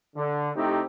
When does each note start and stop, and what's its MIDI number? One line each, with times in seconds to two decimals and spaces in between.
0.16 0.50 50
0.56 0.82 48
0.56 0.82 57
0.56 0.82 60
0.56 0.82 63
0.56 0.82 64
0.56 0.82 67